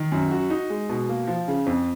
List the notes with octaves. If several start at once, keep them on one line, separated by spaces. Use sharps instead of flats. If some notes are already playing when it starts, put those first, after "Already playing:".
Already playing: D#3
F#2
F#4
D#4
G#3
B2
A#3
F3
C#3
F2